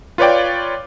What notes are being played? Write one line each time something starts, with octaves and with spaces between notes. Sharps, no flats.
F4 B4 C#5 D5 G5